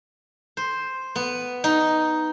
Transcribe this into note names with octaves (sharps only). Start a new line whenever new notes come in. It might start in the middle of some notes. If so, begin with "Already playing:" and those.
C5
B3
D#4